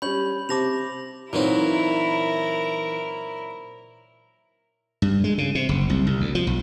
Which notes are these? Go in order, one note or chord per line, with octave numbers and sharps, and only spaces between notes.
G3 C#4 B5 G6 F#7
C3 C5 A5 D6 A#6 F7
A#2 E3 F#3 C4 D#4 E4 A#4
G2
G#3
C#3
C3
F#1
C2
C2
D2
F3
B1